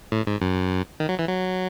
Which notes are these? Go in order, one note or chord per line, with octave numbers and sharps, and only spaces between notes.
A2
G#2
F#2
D#3
F#3
E3
F#3